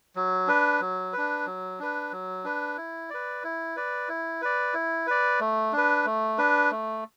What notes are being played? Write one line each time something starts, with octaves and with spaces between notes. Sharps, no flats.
F#3
D4 B4
F#3
D4 B4
F#3
D4 B4
F#3
D4 B4
E4
B4 D5
E4
B4 D5
E4
B4 D5
E4
B4 D5
A3
D4 B4
A3
D4 B4
A3